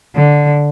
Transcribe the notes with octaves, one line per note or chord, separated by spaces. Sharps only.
D3